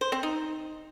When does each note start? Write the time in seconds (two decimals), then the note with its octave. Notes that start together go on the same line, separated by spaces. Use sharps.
0.01 C5
0.12 C4
0.23 D#4